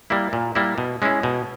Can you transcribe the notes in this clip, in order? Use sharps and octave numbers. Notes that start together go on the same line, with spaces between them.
G3 A#3 E4
A#2
G3 A#3 E4
B2
G#3 C#4 E4
B2